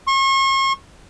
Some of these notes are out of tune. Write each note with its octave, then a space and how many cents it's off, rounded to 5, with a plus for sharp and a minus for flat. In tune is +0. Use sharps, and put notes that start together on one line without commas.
C#6 -40